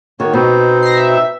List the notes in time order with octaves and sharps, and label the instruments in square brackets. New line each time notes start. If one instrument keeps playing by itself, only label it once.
[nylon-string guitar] D#3 [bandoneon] A#3 F#4 C#5
[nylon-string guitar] B2 [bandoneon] C4 D#4 C5
[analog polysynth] A#6 C7
E5